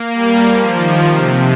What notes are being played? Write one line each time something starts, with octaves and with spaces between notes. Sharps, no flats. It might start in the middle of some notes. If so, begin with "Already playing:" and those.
Already playing: A#3
G3
F3
D#3
C3